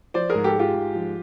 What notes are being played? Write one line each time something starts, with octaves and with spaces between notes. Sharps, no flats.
F3 C5 D5
G#2 G#4 A#4
G4 A4
G#3 F4 G4
G#2
F3